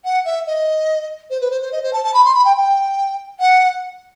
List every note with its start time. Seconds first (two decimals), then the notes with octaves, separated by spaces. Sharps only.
0.04 F#5
0.25 E5
0.46 D#5
1.30 C5
1.40 B4
1.50 C5
1.61 C5
1.72 D#5
1.83 C5
1.93 A5
2.04 A5
2.13 B5
2.25 C6
2.34 B5
2.45 G5
2.56 G5
3.40 F#5